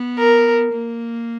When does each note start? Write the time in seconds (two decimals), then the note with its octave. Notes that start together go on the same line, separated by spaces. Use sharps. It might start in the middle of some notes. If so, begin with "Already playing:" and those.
Already playing: B3
0.18 A#4
0.72 A#3